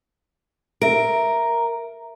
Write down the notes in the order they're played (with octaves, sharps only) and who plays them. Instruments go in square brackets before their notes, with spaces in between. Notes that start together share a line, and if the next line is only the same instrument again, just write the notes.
[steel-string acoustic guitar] A#4 [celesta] E5 D7